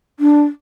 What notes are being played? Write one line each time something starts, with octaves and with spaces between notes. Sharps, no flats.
D4